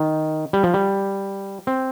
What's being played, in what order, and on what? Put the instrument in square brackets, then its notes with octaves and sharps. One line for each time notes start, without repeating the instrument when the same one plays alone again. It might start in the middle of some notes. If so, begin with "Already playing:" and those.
Already playing: [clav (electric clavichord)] D#3
G3
F3
G3
C4